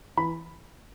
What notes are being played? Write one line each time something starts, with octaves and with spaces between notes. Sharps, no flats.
E3 B5